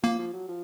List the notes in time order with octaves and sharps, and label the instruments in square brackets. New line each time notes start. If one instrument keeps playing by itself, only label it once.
[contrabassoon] F3 [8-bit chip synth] A#3
[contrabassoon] F3
F#3
F3